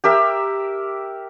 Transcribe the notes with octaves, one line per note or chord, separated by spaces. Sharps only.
G4 A#4 E5